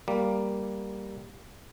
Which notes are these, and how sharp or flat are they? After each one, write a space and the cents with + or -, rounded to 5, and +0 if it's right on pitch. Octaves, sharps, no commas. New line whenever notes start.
G3 +0 A#3 +0